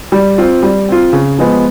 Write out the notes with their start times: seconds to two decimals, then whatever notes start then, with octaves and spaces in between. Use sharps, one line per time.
0.12 G3
0.38 C4 F4
0.63 G3
0.89 C4 F4
1.13 C#3
1.38 F3 G#3 B3